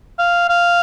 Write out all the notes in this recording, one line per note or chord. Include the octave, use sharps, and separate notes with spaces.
F5
F5